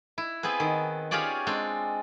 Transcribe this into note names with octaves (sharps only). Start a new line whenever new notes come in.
E4
B3 C4 G#4 B4
D#3
C#4 F4 G4 G#4 C#5 D5
G#3 C4 D4